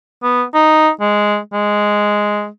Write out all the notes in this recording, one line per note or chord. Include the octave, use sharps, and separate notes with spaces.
B3
D#4
G#3
G#3